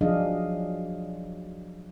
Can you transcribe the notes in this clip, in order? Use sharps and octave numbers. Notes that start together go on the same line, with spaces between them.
F3 F#3 D4 G#4 D#5 F5